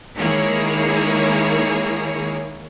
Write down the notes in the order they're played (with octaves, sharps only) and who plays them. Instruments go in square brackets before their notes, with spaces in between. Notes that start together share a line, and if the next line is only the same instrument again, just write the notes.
[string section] D#3 G#3 A#3 E4 G#4 C#5